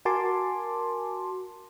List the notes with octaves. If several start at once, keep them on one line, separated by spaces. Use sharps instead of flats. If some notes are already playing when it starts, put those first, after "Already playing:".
F#4 A#4 G#5 A5 C6 D6